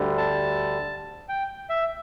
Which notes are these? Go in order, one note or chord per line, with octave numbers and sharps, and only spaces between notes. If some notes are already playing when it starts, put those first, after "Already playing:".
Already playing: D2 D3 G3
A5
G5
E5